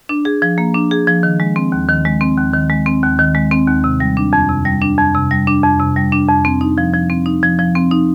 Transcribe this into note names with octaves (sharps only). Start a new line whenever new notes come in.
D4
G#4
F3
A#3
D4
G#4
F3
D#3
G#3
C4
D#2
D#3
G#3
C4
D#2
D#3
G#3
C4
D#2
D#3
G#3
C4
D#2
C3
G3
D4
F2
C3
G3
D4
F2
C3
G3
D4
F2
C3
G3
D4
F2
C4
D#4
F3
F3
C4
D#4
F3
F3
C4
D#4